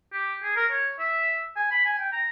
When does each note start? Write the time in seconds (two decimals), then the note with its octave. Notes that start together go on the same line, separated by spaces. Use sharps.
0.13 G4
0.43 G#4
0.56 A#4
0.71 C#5
0.99 E5
1.56 G#5
1.71 B5
1.85 G#5
1.99 G5
2.13 A#5